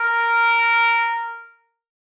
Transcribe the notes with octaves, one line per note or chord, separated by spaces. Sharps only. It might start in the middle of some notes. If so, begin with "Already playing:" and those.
Already playing: A#4